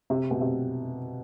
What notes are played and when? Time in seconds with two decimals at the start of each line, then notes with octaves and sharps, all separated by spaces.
0.10 C3
0.31 B2
0.41 C3